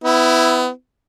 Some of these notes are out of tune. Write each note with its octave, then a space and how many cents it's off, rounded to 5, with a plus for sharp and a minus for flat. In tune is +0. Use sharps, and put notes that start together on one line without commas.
B3 +30 E4 +0